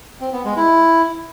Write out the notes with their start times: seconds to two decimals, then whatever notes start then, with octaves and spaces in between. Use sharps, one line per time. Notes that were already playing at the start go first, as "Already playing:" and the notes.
0.21 C4
0.33 B3
0.44 G#3
0.56 E4